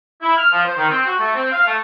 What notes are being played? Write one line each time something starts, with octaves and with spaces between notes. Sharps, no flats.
E4
F6
F3
C5
D#3
C4
F#4
A3
C4
F5
A3